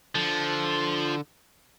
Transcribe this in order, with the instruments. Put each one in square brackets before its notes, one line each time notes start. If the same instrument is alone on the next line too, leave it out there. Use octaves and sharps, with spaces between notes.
[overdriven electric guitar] D3 [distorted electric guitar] F3